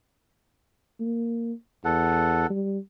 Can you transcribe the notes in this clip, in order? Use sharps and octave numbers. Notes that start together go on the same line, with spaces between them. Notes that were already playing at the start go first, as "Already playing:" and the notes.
A#3
E2 A4 F#5
G3